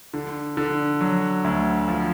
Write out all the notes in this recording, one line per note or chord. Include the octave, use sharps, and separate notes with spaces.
D3
D3
F#3
D2
F3